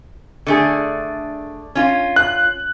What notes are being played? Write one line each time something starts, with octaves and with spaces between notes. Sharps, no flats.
D3 A3 G#4
C#4 F4
F#6